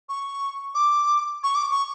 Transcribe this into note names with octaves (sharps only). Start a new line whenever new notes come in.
C#6
D6
C#6
D6
C#6